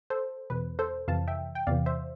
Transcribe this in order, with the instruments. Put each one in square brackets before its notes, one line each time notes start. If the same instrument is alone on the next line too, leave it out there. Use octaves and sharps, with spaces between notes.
[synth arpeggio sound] A4 C5
E2 B2 B4
A4 C5
F2 C3 E3 F5 A5
E5 G5
G5
E2 C3 E3 D5 F5
C5 E5